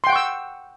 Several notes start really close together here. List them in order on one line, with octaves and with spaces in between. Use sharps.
C6 G5 F#5 C#6 E6